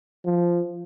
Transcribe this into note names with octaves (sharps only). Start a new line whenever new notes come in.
F3